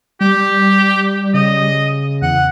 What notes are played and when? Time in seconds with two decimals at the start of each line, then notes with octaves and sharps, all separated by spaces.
0.21 G3 G4
1.34 C#3 D#5
2.22 E2 F#5